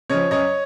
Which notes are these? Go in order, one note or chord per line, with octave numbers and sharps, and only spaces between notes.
C#3 F3 C#5 D#5
F#2 C#5 D#5